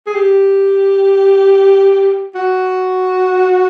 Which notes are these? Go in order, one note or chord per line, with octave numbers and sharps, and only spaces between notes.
G#4
G4
F#4